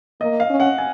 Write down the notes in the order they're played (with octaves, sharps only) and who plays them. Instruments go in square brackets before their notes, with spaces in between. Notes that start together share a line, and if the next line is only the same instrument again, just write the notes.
[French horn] A#3 [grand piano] D#5
[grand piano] F5
[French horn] C#4
[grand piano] F#5
G#5